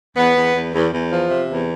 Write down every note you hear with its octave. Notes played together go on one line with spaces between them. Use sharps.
E2 B3
E2
E2
E2
E2
F3
C3
E2